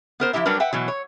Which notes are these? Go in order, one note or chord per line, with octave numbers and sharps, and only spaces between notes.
B3 A#4 C5
F3 G#3 E4 G4 E5
F#3 G3 D4 A#4 B4
B4 E5 F#5 G5
B2 E3 F#3
C#5